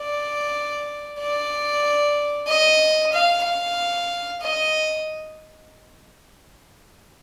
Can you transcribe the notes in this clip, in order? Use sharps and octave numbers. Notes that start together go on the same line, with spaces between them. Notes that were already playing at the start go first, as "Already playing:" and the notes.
Already playing: D5
D5
D#5
F5
F5
D#5